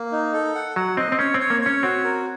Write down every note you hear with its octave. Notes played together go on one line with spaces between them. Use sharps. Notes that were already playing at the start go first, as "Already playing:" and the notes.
Already playing: A#3
D#4
A4
F#5
F#3 F#5
C4 D#5
C4
C#4 C#5
C4
C#5
A#3
C#4 C#5
C4 F#4
A#4